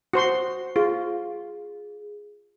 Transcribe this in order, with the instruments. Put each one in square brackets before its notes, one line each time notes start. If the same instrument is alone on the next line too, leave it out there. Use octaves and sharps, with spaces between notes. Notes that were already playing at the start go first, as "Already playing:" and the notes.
[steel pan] F#4 C5 C6
[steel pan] F4 [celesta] G#4